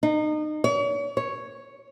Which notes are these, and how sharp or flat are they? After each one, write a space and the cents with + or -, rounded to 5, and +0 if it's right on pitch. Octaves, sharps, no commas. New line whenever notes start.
D#4 -30
C#5 +40
C#5 +0